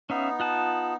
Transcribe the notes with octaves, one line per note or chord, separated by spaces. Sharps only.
B3 C#4 D#4 E5 F5
F4 F#5 A5